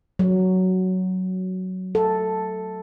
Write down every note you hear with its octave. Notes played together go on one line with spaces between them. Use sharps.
F#3
A4